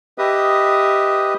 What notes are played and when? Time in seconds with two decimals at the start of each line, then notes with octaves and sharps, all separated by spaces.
0.18 G4 B4 D#5 E5 D#6